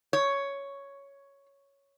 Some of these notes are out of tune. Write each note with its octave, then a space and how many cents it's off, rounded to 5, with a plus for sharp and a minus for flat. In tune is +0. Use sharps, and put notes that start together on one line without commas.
C#5 +5